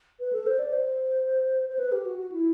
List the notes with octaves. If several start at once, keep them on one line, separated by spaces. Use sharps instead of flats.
B4
A4
C5
D5
C5
C5
B4
G4
F#4
F#4
E4